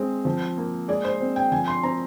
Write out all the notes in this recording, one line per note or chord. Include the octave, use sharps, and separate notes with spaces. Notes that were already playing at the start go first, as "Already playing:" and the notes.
Already playing: G#3 C4
F3
A#3
G#3 D5
C5
C4
G5
F3 G#5
C6
C4 A#5